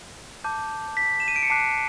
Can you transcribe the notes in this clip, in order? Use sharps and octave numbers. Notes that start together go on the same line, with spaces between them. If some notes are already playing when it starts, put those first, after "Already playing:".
A5 D6 G6
B6
E7
D#7
D7
C#7
A5 D6 F#6 C7